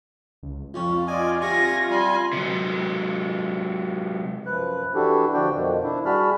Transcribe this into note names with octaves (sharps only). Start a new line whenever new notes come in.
C#2
F2 C#4 F4
D5 D#5 G#5
C3 G#5 C#6 A#6
G3 G#5 C6
C3 F#3
F#2 F3 B4 F#6
E3 D4 E4 F#4 G4 A4
D3 F3 D4 F#4 D5 G5
F2 B2 D#3 F3
D4 E4
G3 F#4 G#4 A5 B5 F6